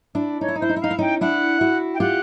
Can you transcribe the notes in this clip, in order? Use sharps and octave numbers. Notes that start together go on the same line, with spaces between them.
D4 E4
D#4 C#5
E4
D#4
E4 C5
D#4
E4
D#4 F5
E4
C#4 D#4 G5
D4 E4 F#5
E4 F#4
G5
F4 G4 F#5